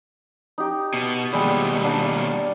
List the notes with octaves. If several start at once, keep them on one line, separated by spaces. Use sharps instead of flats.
D#4 G4
B2
D#2 B2 G3 G#3
D4 F5 A#5